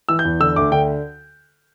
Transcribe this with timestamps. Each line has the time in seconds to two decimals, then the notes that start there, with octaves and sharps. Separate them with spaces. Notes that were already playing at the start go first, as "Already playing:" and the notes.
0.09 E3 E6
0.19 G6
0.25 E2
0.40 D3 E6
0.56 D2 D6
0.72 D3 G5